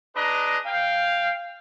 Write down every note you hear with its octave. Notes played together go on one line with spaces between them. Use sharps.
D4 G#4 B4 D#5 A#5
F5 G5